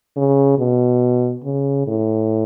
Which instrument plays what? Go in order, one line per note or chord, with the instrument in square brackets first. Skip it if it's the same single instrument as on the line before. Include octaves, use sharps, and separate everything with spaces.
[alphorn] C#3
B2
C#3
A2